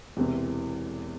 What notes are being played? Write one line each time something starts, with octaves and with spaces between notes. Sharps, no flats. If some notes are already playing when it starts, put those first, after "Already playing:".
E1 E2 C3 E3 C4